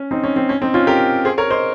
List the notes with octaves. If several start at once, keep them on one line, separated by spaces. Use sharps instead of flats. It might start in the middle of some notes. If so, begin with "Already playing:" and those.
Already playing: C#4
C4 D#4
C#4
C4
C#4
C4 D#4
C#4 F4
G4 A#4
G#4 C5
A#4 C#5
C5 D#5